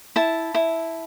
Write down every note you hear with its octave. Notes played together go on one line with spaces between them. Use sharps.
E4 A5
E4